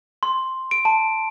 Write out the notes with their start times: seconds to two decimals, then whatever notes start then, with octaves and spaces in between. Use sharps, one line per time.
0.23 C6
0.71 D7
0.85 A5